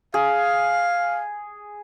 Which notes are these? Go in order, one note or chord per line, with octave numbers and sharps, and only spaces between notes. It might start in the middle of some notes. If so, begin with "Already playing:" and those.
G#4 F5